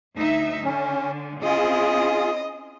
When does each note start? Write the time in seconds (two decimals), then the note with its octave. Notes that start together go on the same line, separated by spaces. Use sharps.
0.16 D2 D#4 E5
0.63 D3 C#4
1.43 C4 C#4 E4 F4 G#4 D#5